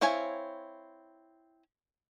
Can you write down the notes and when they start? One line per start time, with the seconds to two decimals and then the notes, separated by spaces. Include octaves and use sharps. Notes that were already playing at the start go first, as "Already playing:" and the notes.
0.01 C4 E4 C#5 F5 G#5